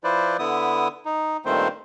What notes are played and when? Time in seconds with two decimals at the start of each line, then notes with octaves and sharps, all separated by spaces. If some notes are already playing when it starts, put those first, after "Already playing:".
0.04 F3 E4 B4 C5 D5
0.39 D3 B3 E4 D#6
1.05 D#4
1.45 G2 A#2 D#3 A3 C4 C5